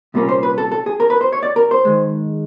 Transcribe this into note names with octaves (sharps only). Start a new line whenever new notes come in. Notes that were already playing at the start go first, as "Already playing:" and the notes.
C2 A#2 G3 A#3 C#4
C5
B4
A4
A4
G#4
A#4
B4
C5
C#5
D5
A#4
C5
D#3 G#3